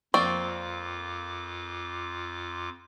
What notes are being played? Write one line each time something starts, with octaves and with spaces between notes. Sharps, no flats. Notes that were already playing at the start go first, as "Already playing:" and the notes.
F2 A#3 C4 F4 D5 C#6 D6